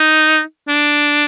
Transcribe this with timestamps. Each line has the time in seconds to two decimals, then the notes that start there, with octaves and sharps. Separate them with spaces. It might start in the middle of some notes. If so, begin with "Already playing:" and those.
Already playing: D#4
0.68 D4